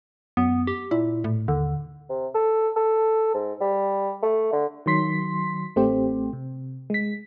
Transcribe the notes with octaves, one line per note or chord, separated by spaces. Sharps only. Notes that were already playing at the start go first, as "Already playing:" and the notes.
F#2 B3
G4
A#2 E4
A2
D#2 D3
C3
A4
A4
G#2
G3
A3
D3
D#3 F#3 C6 B6
A1 A3 C4 G4 C5
C3
G#3 B6